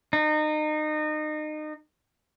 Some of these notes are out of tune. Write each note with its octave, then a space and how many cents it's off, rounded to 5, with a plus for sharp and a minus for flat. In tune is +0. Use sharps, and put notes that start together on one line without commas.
D#4 -30